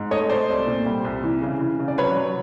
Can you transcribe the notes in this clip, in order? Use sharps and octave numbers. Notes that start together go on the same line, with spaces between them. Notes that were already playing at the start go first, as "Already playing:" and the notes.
Already playing: G#2
A3 C#5 D#5
A3 C5 D5
C2
A#2
G3
C2
E3
C#3
E3
C#3
D5
F#3 B4 C#5
F#3